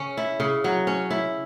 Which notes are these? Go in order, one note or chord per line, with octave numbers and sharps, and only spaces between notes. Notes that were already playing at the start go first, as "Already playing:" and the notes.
Already playing: C#3 C#4
E4
C#3
F#3
C#4
E4